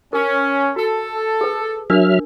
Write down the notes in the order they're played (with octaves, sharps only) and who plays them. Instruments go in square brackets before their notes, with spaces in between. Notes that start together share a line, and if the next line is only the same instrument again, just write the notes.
[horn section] C#4 [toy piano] A#4
[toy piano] F#4 [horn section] A4
[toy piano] G#4 B4
[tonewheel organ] F#3 E5 F6 [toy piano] D4 A#4 E6